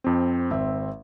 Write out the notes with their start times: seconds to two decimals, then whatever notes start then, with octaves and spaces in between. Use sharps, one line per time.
0.04 F2 C4
0.51 G#1 C4 E5